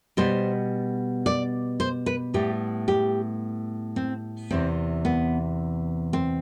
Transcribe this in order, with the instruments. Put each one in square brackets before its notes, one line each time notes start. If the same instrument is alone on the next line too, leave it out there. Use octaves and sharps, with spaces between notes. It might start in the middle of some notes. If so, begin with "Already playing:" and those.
[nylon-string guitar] B2 G3 B3 C5
D5
C5
B4
A2 G3 B3 G4
G4
C4
E2 C3 E3 C4
B3
C4